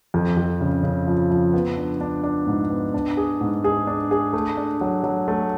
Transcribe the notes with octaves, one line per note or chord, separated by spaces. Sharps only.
F2
F2
C#3
C#3
F3
F3
B3
D4
D4
D4
G#2
B3
D4
G#4
G#2
G#4
D4
G#4
A3
D4
F#3
F#3
A3